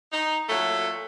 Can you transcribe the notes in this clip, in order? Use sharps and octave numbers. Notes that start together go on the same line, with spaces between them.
D#4
A#2 F#3 A3